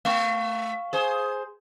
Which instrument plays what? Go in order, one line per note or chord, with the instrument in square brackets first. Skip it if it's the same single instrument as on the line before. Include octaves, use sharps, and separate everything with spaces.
[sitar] A3 [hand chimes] F5 C#6
[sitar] G#4 C5